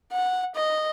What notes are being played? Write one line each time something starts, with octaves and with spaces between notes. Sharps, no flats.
F#5
D#5